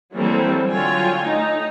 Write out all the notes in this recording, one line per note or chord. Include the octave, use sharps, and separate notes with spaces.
E3 F#3 G3 A#3 C4 A4
D3 F#3 F4 C#5 G5 G#5
A3 D#4